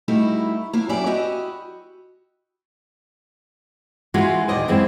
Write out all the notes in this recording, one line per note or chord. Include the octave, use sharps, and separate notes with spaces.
G3 A3 D#4 E4 F#4
A#3 B3 E4
F#2 E4 G4 D5 G#5
E4 F#4 G4 D#5
E3 G#3 A#3 F4 F#4
D#2 A#2 D5 D#5 G#5
F#2 E3 G#3 B3 C4 F4